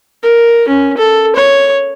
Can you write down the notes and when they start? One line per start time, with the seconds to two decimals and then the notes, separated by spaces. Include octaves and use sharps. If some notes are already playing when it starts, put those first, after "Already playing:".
0.23 A#4
0.68 C#4
0.97 A4
1.36 C#5